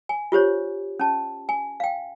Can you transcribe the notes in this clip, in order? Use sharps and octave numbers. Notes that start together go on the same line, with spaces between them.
G#5
F4 G4 C5 C#5
C#4 A5
G#5
F5 G5